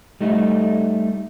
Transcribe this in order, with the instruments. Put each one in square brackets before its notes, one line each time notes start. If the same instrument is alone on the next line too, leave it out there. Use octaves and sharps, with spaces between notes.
[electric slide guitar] G3 A3 D#4